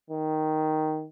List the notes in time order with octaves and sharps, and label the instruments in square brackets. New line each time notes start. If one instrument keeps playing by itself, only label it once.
[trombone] D#3